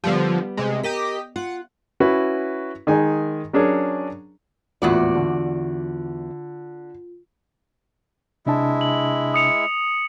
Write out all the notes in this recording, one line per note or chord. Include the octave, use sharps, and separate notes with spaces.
D3 F3 G3 B3
C3 G#3
G4 A#4 D#5 B6
F4 F#5
C#4 E4 F#4 B4
D#3 G#3 D#4 G#5
F#3 C#4 D4 G#4 A#4 C#5
D#1 E2 A2 B3 F4 F#4 D5
D3
C3 G#3 D4 E4 A5
F#7
D#6 C#7 F7